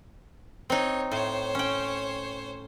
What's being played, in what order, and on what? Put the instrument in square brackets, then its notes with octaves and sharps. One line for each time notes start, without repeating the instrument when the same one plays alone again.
[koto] C4 D#4 [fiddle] C#5
[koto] A2 [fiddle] C5 C#5
[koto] C#4 G5